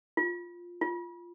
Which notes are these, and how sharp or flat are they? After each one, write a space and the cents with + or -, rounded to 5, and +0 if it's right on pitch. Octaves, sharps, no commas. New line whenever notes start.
F4 +5
F4 -5